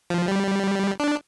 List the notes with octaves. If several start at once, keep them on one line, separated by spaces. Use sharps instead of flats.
F3
G3
D4